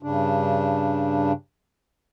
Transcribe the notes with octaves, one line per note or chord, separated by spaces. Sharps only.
G2 C#3 D4